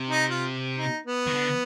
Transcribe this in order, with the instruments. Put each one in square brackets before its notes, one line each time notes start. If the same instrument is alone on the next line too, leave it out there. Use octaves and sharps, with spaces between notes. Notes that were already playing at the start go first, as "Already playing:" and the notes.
Already playing: [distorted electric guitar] C3
[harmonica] D#4
F4
D#4
B3
[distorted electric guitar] D#3
D3